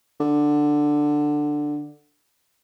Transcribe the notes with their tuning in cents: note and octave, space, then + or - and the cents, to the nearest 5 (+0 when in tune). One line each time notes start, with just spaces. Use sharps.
D3 +10